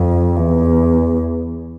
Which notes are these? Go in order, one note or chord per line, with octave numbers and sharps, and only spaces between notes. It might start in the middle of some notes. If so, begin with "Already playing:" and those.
Already playing: F2
E2